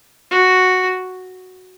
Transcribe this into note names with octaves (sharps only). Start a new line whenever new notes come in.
F#4